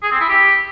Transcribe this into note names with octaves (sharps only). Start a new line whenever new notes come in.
G#4
C4
E4
G4